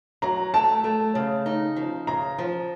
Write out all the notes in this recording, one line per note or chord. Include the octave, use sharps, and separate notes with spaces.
F#3 A#5
A3 A5
A3
C#3
D#4
F3
C#3 A#5
F3